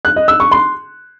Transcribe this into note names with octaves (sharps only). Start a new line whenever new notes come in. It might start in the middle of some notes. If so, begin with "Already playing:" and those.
F#6
D#5
E6
C#6
C6